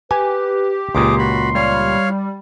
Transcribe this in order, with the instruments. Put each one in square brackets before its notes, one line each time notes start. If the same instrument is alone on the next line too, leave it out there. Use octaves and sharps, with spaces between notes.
[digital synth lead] G4 [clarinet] B4 [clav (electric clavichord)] G#5
[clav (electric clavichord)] C#2 A#2 [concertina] G#4 D6 [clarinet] C6
[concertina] F#4 B5
[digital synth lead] G3 [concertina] C#5 F5 F6